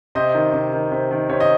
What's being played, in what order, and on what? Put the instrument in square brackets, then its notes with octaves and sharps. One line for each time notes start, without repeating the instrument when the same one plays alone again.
[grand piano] C3 C5 D#5
D#3
C3
D#3
C3
D#3
C3 C#5
D#5